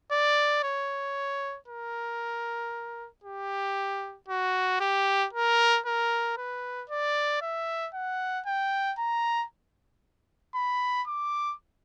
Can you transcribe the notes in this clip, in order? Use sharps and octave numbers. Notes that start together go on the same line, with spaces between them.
D5
C#5
A#4
G4
F#4
G4
A#4
A#4
B4
D5
E5
F#5
G5
A#5
B5
D6